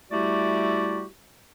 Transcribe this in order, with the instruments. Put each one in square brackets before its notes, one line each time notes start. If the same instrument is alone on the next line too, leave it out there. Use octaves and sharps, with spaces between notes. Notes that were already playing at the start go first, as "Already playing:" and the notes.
[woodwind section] G3 A3 E4 F#4 G4 D5